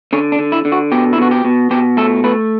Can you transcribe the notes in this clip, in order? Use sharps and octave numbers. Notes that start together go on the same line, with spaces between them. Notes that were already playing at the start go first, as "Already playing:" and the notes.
D3 C#4
D4
D3
E4
D3
F#4
B2 G4
E4
B2 F#4
G4
B2
B2 G4
A3 A4
A3 B4